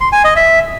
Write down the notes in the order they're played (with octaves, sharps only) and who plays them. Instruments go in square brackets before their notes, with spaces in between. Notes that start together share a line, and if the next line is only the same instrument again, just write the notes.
[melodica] C6
G#5
D#5
E5